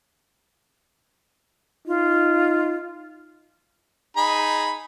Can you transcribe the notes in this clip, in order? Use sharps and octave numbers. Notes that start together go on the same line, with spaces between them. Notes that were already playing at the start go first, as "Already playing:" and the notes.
D#4 F4
D#4 G#4 B5